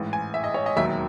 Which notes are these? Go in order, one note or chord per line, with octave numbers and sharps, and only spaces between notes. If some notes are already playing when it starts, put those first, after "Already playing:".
Already playing: A1 G#2 E3
G#5
E5
D#5
C#5
D#5
E1 D#2 D#3 F#3 E5